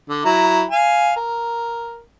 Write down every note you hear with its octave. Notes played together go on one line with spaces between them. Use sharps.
D3
F#3 E4 A#5
F5 G#5
A#4